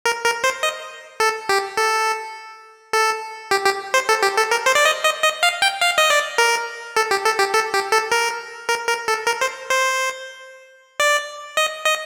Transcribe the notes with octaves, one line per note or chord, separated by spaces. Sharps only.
A#4
A#4
C5
D#5
A4
G4
A4
A4
G4
G4
C5
A4
G4
A4
A#4
C5
D5
D#5
D#5
D#5
F5
G5
F5
D#5
D5
A#4
A4
G4
A4
G4
A4
G4
A4
A#4
A#4
A#4
A4
A#4
C5
C5
D5
D#5
D#5